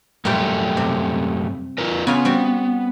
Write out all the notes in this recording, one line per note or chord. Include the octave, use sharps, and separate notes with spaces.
F#2 A#2 G3 A3 G4
C3
F4 A#4 B4
C#3 B3 F4 G#5
G3 C4 F#4